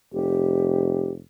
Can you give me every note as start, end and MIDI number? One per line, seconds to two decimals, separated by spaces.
0.13 1.21 29
0.13 1.11 67